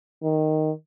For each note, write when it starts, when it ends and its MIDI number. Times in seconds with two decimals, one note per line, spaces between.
0.23 0.71 51